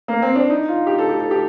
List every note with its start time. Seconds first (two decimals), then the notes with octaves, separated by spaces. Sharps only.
0.08 A#3
0.22 C4
0.36 D4
0.50 D#4
0.68 F4
0.87 G4
0.98 A4
1.09 G4
1.20 A4
1.31 G4